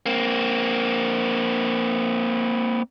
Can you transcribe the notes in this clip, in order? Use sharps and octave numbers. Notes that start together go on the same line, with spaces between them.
A#3 C4